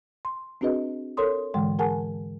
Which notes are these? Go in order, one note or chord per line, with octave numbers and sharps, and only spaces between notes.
C6
C4 D4 F#4 G#4 B4 D#5
A4 A#4 C#5 C6 D#6
G#2 D3 E3 G#3 G5 C6
G#4 A#4 F#5 G#5 A5